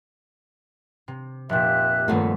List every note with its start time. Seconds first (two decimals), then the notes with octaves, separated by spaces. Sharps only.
1.08 C3
1.49 F1 A#2 G4 E5 F#6
2.08 D#1 G2 A#2 A3 B3